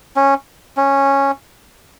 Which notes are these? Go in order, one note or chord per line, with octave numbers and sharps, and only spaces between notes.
C#4
C#4